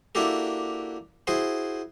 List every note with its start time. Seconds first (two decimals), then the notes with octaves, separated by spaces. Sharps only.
0.15 A#3 D4 E4 F#4 G4 A4
1.27 E4 F#4 G#4 C5